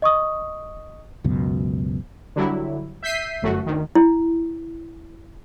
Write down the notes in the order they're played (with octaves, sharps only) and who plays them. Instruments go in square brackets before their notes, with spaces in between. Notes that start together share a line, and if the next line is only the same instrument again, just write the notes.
[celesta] D#5 C#6 D#6
[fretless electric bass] C#2 F#2 B2
[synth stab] D3 F#3 G3 E4
E5 G6 B6 C7 D#7
G1 F#2 A3 F#4
D2 D#3
[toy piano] E4